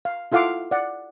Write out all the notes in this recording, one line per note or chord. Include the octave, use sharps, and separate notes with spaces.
F5
E4 F4 A4 F5 F#5 D6
D5 F#5